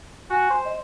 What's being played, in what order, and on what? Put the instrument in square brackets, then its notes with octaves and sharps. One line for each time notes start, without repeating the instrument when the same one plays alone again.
[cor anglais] F#4 [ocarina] G#5
[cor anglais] C5
[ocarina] D#5